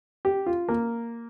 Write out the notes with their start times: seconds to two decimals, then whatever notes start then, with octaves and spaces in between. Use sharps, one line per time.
0.25 G4
0.46 F4
0.68 A#3